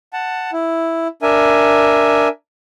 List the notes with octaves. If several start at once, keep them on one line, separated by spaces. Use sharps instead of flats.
F#5 A5
E4
D4 A#4 E5 G#5